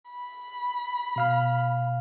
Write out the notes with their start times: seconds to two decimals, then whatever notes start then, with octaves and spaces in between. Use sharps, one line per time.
0.11 B5
1.16 B2 F5 F6